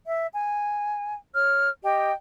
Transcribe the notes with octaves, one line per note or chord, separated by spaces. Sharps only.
E5
G#5
C#5 F6
G4 D#5 G5